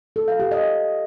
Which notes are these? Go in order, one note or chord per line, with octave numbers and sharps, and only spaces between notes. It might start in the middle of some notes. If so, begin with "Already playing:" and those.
A4
F5
G4
D#5